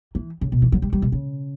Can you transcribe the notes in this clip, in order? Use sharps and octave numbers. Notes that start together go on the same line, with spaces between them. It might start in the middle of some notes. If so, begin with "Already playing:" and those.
E3
C#3
B2
E3
F#3
G3
G3
B2
C#3